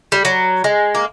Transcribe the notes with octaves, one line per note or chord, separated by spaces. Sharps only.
G3
F#3
G#3
A#3